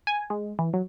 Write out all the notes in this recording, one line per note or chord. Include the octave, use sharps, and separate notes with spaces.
G#5
G#3
E3
F#3